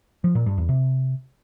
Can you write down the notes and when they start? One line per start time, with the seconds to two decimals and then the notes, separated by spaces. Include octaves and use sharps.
0.24 F3
0.35 A#2
0.46 G2
0.57 E2
0.69 C3